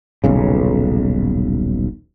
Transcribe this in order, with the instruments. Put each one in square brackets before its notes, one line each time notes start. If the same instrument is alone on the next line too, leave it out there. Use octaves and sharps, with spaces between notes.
[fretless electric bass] D#1 B1 C#3